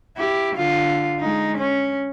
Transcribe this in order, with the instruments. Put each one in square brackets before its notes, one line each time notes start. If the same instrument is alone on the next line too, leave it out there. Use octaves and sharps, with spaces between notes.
[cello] E4 G4
D3 F4
G#3 D#4
C#4